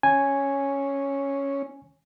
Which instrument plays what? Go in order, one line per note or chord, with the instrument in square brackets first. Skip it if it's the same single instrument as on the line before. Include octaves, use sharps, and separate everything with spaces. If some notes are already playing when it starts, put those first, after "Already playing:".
[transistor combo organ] C#4 [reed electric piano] G#5